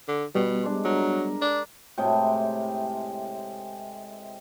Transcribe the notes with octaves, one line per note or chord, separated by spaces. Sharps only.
D3
B2 G3 B3
G#3 D4
F#3 A#4
D4
A2 C3 G#3 G5